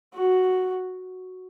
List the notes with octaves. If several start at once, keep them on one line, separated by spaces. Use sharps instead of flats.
F#4